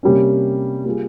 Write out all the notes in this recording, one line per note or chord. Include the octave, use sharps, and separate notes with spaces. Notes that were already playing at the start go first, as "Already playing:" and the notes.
C3 G3 A#3 C#4
G3 A#3 F4 G#4